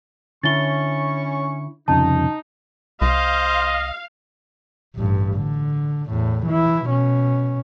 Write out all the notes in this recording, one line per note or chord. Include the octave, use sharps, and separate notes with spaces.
D3 C#4 E4 C#6 A6 G7
C2 F2 C#3 D#4 A5
C2 C5 D#5 F5
A1 G2
D3
E2 A2
E3 E4
B2 C#4